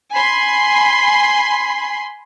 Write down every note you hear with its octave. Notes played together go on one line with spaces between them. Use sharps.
G#5 B5 C6